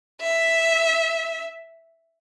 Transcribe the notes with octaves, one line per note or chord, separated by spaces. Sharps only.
E5